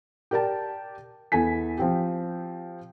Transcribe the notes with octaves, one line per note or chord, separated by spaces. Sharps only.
G4 A#4 D5 G5 A5
E2 E3 A4 G#5 B6
F3 C4 G4